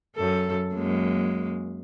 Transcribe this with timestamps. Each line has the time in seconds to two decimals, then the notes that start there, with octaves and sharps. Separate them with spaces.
0.16 F#2 A4
0.74 F#2 G#3 A#3